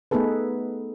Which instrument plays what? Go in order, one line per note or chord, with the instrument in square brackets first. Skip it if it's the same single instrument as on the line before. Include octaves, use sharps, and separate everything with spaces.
[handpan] A3 B3 D#4 G#4 A4 B4